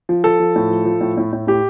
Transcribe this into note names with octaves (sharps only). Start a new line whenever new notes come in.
F3
F3 A4
F3
A2
F3
F3
A2
A2
A2
A2 G4